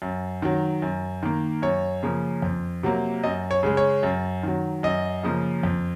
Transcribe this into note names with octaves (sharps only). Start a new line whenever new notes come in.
F#2
D#3 F#3
F#2
D#3 A#3
F#2 C#5
C#3 F3 A#3
F2
C3 F#3 A#3
F#2 D#5
C#5
C#3 G#3
C#5
F#2
D#3 F#3
F#2 D#5
C#3 F3 A#3
F2